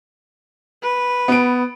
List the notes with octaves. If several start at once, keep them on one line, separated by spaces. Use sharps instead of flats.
B4
B3 D7